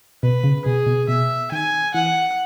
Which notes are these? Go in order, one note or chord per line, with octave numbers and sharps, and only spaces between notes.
B2 B4
C#3
B2 G#4
B2
B2 E5
D#3 G#5
E3 F#5